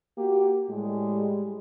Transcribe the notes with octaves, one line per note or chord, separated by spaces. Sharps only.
A#3 F#4 G4
A2 G3 G#3